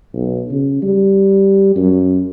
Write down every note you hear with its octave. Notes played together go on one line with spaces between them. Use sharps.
B1
C#3
G3
F#2